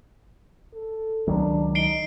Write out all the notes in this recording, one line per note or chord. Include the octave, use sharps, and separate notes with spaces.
A4
C#2 D#3 F#3 D4
D#4 C7 D7 G7